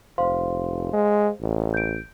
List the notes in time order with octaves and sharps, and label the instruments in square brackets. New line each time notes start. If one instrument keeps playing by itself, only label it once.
[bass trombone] F1 [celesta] C5 F5 C6
[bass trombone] G#3
A1
[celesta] G6 D7